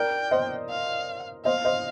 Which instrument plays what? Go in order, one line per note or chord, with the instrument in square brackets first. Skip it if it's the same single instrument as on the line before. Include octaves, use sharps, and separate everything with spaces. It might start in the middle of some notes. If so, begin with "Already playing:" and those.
Already playing: [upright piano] A#4 D5 [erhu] G5
[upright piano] C5 D#5
[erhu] F5
[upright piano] C5 D#5 [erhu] F5
[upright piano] C5 D#5